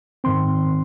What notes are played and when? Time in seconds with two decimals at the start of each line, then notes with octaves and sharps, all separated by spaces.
0.24 G#2 D#3 C4 C6